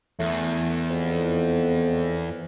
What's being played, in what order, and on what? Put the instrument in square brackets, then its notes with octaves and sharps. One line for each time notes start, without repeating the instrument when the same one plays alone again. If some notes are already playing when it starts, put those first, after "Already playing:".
[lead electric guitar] E2 [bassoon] A3
[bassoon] F2